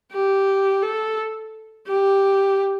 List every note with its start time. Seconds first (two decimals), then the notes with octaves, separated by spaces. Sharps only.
0.12 G4
0.82 A4
1.88 G4